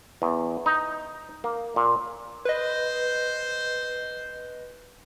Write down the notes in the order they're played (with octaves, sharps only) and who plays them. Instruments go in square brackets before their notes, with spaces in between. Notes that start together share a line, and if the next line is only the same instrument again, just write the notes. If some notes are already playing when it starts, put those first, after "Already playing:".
[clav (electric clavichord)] E2
D#4
A#3
A#2
[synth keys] B4 D#5 [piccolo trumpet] C5